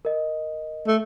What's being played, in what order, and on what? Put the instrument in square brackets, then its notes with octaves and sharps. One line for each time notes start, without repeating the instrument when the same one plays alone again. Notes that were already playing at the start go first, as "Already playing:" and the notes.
[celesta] A#4 D#5
[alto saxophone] A3